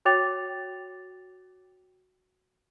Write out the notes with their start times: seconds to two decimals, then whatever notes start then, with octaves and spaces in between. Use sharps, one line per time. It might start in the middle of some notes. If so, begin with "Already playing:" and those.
0.05 F#4 C#5 G5 D6 A6 F7